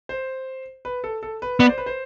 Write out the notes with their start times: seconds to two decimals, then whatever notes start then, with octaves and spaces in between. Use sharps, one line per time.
0.09 C5
0.85 B4
1.04 A4
1.23 A4
1.42 B4
1.60 B3 D5
1.69 C5
1.78 B4
1.86 C5